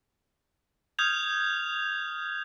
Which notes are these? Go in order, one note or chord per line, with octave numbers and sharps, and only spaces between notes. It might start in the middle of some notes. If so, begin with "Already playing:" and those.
D#6 F6 G6 G#6 F7